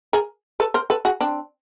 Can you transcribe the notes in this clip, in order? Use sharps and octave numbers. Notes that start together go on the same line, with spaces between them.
G#4 A#4
A4 B4
A#4 C5
A4 B4
F#4 G#4
C4 D4